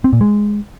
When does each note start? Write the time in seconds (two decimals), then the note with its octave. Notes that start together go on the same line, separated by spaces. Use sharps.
0.04 C4
0.13 A#2
0.21 G#3